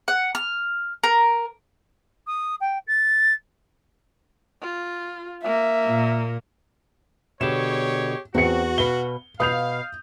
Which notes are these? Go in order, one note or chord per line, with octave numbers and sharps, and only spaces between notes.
F#5
F6
A#4
D#6
G5
A6
F4
A#3 E5
A#2
B2 D3 G4 G#4 C#5 E7
E2 C4 F#4 C#7
B2 B4 F5 G7
B2 B4 F5 D#6 G6 F7